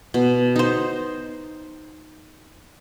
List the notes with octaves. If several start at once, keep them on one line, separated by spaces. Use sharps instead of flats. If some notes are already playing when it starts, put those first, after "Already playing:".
B2
D#4 C5